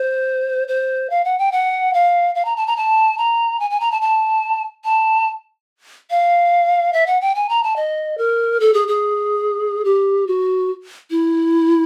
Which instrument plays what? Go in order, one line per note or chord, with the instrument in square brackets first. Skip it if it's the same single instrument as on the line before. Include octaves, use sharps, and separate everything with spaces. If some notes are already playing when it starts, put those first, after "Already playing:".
Already playing: [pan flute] C5
C5
F5
F#5
G5
F#5
F5
F5
A#5
A5
A#5
A5
A#5
G#5
G#5
A#5
A5
A5
A5
F5
E5
F#5
G5
G#5
A#5
A5
D#5
A#4
A4
G#4
G#4
G4
F#4
E4